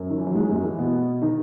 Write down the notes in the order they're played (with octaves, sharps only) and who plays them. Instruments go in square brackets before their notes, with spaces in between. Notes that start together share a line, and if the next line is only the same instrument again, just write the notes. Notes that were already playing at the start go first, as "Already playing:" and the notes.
Already playing: [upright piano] F#2
D#3
E3
F#3
G#2 G#3
F#2 F#3
E3
B2 B3
D#3 D#4